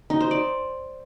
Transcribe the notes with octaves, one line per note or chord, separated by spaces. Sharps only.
D#4
C5
D5